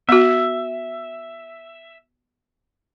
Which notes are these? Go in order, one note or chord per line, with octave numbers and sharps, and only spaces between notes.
B3 F#4 E5